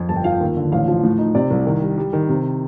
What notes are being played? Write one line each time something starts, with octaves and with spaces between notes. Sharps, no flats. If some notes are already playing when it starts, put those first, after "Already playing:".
Already playing: F2
G1 A5
G5
F3 F5
G5
D#2
D3
A1 F5
F3
A2
D#4
C3 D5
C2
D#3
G3
G3
D#3
C3